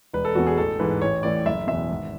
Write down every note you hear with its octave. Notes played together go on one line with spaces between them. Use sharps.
E1 B4
A4
E2 B2 F#4
G#4
A1 A4
G#2 E3 B4
A1 C#5
A2 E3 D5
F#1 E5
E2 B2 E5
G#1